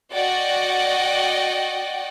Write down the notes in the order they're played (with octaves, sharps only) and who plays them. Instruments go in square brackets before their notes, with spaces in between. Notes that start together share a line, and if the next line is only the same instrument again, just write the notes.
[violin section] F#4 D5 D#5 F#5 G5